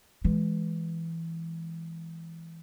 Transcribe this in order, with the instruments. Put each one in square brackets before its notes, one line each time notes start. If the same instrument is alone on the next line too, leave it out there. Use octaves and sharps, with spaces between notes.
[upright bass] E3 G#3